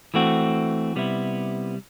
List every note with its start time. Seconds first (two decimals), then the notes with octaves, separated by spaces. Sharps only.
0.14 E3 A3 C4 F#4
0.96 C3 G3 B3 E4